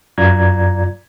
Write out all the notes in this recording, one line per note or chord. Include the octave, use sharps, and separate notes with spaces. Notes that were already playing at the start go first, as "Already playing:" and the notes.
F#2 F4 D5 A#5 G#6